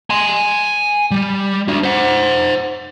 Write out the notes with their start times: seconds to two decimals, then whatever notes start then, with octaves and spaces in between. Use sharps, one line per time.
0.10 G#5 C6
1.11 G3
1.68 D4 F#4
1.83 C5 F#5